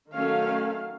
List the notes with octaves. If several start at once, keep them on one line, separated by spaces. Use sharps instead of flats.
D#3 F#3 A3 C#4 F5